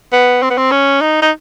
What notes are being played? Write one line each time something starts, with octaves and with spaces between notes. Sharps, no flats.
B3
C4
B3
C4
C#4
D#4
D#4